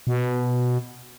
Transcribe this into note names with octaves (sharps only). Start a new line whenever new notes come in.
B2